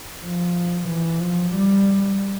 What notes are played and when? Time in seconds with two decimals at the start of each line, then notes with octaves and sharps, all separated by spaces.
0.25 F3
0.88 E3
1.20 F3
1.53 G3